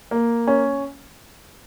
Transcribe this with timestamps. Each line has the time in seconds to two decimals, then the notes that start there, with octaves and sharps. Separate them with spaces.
0.11 A#3
0.47 C#4